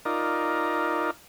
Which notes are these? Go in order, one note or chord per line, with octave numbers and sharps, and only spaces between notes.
D#4 F4 A#4 D5